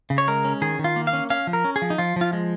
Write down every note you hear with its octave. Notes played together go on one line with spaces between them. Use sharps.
C#3
C#5
G#3 A#4
C#4
D#3 G#4
D#3
F4
A#3
F5
C#4
C#4 F5
F3
A#4
C#4
G#4
F3
D#4
F3 F4
F3 F4
G#3